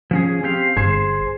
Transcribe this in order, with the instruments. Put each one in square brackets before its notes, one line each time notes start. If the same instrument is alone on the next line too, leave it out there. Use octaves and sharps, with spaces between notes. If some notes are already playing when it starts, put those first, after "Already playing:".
[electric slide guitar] F3 C#4 G#4
C4 G4 F5
[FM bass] G1 [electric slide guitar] G#4 C5